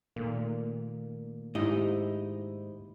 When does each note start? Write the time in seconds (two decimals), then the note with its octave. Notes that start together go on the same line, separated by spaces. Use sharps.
0.16 A#2 D#3 A3 A#3
1.55 G#2 D#4 E4 G4 D#5